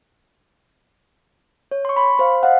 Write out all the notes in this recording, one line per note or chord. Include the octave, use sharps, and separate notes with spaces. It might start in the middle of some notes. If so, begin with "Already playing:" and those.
C#5
C6 C#6
B5 C6
C5 F5
D#5 F5 F#5